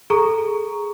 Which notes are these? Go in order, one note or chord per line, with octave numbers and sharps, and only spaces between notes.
G#4 A4 A#5 C#6